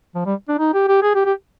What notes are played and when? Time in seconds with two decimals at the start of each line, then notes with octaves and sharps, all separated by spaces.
0.15 F3
0.26 G3
0.48 D4
0.59 D#4
0.74 G4
0.88 G4
1.03 G#4
1.15 G4
1.25 G4